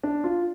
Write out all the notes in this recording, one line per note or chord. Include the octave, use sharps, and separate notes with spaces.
D4
F4